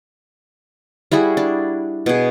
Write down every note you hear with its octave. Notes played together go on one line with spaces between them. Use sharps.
G3 E4 F#4 G#4
D4
B2 G#4